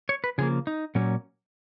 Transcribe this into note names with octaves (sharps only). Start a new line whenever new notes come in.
C#5
B4
C#3 F3 A#3 G#4
D#4
A#2 F#3 A#3 C#4